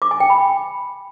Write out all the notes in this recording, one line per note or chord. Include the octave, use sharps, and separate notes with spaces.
D6
G#5
G5
B5